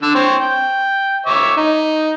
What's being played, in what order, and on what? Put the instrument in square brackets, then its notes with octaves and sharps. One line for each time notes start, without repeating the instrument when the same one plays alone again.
[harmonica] D3 E6
C4 C#5
G5
C#5 E5 D6
D#4